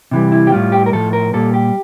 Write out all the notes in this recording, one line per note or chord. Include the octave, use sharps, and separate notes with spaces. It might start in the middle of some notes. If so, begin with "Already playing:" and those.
C3 E3 G3
E4
G4
A2 G3 F4
G4
A#4
A2 F3 A4
A#4
A#2 G3 A4
G4